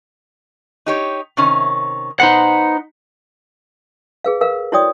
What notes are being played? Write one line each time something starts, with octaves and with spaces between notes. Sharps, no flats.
D#4 G4 C#5
C3 D#3 C#4
B3 D#4 C5 F#5
G#4 B4 F5
A#4 B4 F5
E4 F#4 C#5 D5 G5 D#6